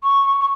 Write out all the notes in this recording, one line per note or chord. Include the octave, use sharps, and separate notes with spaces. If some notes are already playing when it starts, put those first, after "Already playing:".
C#6
C#6